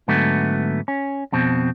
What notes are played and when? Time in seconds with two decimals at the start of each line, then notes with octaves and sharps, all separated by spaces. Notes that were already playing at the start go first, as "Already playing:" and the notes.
0.08 G#2 D3 F#3 A3 B3
0.88 C#4
1.32 F2 B2 C4